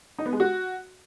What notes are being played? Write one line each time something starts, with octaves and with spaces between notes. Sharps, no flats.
D#4
B3
G#3
F#4